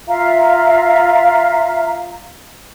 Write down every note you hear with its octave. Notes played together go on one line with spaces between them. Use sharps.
F4 E5 F5 A#5